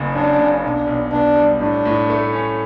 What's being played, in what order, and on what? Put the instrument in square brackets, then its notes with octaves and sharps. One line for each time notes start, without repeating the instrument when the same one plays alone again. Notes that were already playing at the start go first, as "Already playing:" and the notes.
Already playing: [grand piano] F#1 C#3
[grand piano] F#2 [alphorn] D4
[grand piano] C#3
[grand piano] B1 [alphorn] D4
[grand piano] B1
[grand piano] B2 [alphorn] D4
[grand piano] G3
[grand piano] A2 [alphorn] D4
[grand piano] A2
A3
C#4